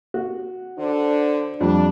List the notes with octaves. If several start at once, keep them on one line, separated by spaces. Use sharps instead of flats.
F#4
D3 D4 C5
F2 G3 D4